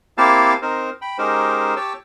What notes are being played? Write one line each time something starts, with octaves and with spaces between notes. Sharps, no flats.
A#3 C4 E4 G4 F5 A5
C4 D#4 A#4 C5
G5 B5
G#3 C#4 D#4 G4 A#4 C5
G4 C#5 G5 A5 E6